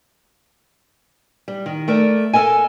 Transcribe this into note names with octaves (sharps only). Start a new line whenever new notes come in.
G3
D#3
A3 A#4 D5
A4 A#4 D#5 G#5